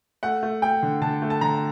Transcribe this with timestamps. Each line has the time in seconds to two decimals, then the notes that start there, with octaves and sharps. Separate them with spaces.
0.23 A3 F#5
0.43 A3
0.62 A3 G5
0.82 D3
1.01 D3 A5
1.22 A3
1.30 A5
1.41 D3 A#5